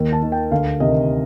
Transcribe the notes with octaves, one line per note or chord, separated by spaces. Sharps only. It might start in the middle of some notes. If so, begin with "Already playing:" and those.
Already playing: D#2
A5
D#3
G5
D2 F5
C3 D#3 D#5